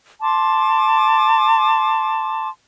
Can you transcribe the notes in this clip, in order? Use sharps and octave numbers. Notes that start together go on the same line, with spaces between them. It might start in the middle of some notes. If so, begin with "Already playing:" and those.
A5 C6 D6